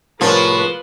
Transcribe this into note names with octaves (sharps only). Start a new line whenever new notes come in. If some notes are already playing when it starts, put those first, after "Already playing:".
A2 C3 F3 G#4 A#4 B4 C#5